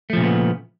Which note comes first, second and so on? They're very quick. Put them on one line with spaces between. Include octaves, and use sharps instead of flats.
A3 F3 A#2 C#3 B3